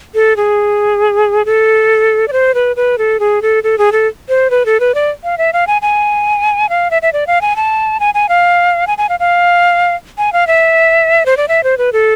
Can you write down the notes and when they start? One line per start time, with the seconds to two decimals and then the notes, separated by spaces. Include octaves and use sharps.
0.15 A4
0.36 G#4
1.45 A4
2.28 D5
2.33 C5
2.54 B4
2.76 B4
2.98 A4
3.20 G#4
3.42 A4
3.63 A4
3.78 G#4
3.92 A4
4.29 C5
4.50 B4
4.66 A4
4.80 B4
4.95 D5
5.24 F5
5.38 E5
5.53 F5
5.67 G#5
5.82 G#5
6.69 F5
6.91 E5
7.02 E5
7.13 D5
7.27 F5
7.41 G#5
7.56 A5
8.00 G#5
8.14 G#5
8.29 F5
8.87 G#5
8.98 G#5
9.09 F5
9.20 F5
10.18 G#5
10.33 F5
10.47 E5
11.26 C5
11.37 D5
11.48 E5
11.64 C5
11.78 B4
11.93 A4